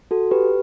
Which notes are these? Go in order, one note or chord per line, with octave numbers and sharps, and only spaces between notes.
F#4 A4
G4 B4